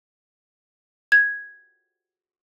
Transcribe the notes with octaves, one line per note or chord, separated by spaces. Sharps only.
G#6